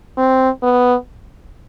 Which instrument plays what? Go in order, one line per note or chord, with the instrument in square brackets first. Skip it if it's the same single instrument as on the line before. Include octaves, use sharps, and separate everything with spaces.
[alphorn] C4
B3